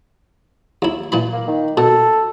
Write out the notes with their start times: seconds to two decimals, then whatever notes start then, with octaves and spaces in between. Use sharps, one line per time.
0.82 D#2 E4
1.12 A#2 E3 B5
1.33 A#3
1.47 D#3
1.77 B2 A4